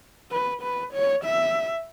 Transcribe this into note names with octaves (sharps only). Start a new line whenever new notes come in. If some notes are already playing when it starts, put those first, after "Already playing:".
B4
B4
C#5
E5